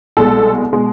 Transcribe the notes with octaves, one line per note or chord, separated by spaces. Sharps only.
C2 B2 G#3 A4
B2 G#3